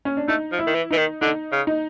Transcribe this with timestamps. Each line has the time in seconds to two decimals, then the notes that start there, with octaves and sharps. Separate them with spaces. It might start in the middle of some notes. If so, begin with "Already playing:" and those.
0.05 C#4
0.17 D4
0.28 A3 D#4
0.52 F3
0.59 E4
0.67 D#3
0.75 E3
0.91 E3 D#4
0.98 D#3
1.21 D3 D#4
1.52 C#3
1.67 D#4